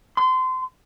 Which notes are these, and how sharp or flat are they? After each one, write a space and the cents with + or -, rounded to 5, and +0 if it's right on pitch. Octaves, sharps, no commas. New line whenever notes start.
C6 -25